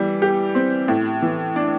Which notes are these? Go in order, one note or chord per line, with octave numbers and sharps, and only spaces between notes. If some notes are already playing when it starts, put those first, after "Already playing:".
Already playing: E3 G3
G4
C4
A2
E3
D4